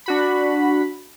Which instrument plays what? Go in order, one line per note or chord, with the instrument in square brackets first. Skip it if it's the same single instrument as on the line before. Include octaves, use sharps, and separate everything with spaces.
[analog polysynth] D4 F#4 B5